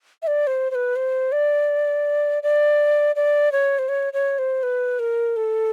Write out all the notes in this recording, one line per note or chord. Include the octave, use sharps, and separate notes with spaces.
E5
D5
C5
C5
B4
C5
D5
D5
D5
C#5
C5
C#5
C#5
C5
B4
A#4
A4